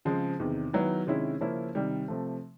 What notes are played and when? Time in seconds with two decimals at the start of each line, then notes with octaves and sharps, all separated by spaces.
0.05 C#3 F3 G#3 C4
0.40 E2 C3 D#3
0.73 D#3 F#3 B3 E4
1.07 C3 D#3 G#3 C#4 E4
1.41 C#3 F3 A#3 C#4 E4
1.75 C3 D#3 G3
2.08 C3 F3 A3